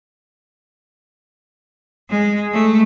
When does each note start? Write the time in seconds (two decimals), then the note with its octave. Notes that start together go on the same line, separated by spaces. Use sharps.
2.09 G#3
2.52 A3